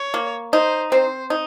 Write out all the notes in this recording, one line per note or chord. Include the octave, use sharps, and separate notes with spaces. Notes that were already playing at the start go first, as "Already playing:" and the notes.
Already playing: C#5
A#3
D#4 C5
C4 C5
D#4